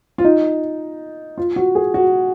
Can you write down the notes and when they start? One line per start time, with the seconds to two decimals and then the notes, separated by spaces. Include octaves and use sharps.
0.18 F4
0.24 D#4
1.38 F4
1.56 F#4
1.75 G#4
1.94 F#4